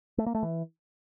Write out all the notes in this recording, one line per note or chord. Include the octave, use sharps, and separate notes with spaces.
A3
A#3
A3
E3